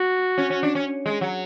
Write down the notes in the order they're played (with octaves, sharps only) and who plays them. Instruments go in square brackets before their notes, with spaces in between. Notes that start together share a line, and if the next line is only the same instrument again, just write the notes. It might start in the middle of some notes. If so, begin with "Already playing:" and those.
Already playing: [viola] F#4
[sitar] C#4
C#4
D4
C#4
G#3
F#3